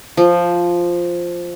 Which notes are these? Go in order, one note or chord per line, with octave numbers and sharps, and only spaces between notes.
F3